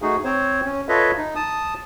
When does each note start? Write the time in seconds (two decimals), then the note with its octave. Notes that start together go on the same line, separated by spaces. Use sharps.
0.02 A3 D#4 F#4 G#4
0.24 C4 C5 C#5
0.65 C#4
0.89 F4 A4 B4 C#5 D#5 E5
1.17 D#4
1.36 A5 D#6